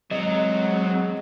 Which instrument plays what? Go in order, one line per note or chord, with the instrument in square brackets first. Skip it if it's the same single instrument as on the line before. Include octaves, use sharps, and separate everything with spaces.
[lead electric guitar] E2 C4 [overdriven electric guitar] F#3 [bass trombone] G#3 [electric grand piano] D#5